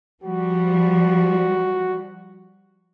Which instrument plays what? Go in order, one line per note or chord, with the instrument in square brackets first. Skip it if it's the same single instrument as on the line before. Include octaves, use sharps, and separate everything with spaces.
[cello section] F3 G3 [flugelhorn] F#4